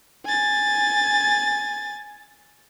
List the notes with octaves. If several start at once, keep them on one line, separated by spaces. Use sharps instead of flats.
G#5 A6